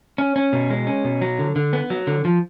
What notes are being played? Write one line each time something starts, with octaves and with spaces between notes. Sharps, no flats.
C#4
C#4
B2
G#3
C#4
B2
F#3
D3
D3
B3
F#3
D3
F3